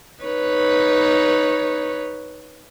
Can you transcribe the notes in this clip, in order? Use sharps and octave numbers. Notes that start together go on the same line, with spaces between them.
D#4 B4 C#5